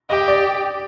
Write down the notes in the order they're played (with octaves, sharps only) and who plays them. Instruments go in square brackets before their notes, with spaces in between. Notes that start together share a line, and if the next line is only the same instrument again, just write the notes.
[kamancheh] G4 [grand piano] D#5
[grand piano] D5